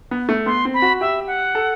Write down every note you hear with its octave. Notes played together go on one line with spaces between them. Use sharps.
B3
A3
B3 C6
C4
B5
F#4
G4 E5
F#5
A4